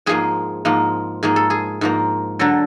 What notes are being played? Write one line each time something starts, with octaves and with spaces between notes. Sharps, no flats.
G#2 F3 A#3 G#4
G#2 F3 A#3
G#2 F3 A#3 G#4
A4
G#4
G#2 F3 A#3
D3 F#3 A4